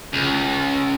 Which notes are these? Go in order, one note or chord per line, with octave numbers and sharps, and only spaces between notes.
C#2